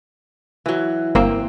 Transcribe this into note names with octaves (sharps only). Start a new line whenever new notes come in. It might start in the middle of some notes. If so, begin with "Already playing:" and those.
E3 F#3
G1 A#3 C4